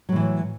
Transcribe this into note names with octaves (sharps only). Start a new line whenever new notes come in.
A2 E3 F#3